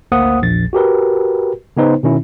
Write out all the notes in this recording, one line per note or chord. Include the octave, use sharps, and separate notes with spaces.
G#1 D2 A#3 C5 F#5 D#6
A#1 E2 A6
F#4 G4 A#4 B4
C#3 B3 D#4 B4 C5
B2 D#3 C#4 E4